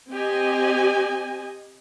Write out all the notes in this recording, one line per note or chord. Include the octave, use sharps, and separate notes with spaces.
C4 G4 D#5 G#5